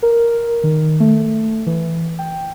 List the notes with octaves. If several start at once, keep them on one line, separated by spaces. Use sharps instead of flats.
A#4
D#3
A3
E3
G5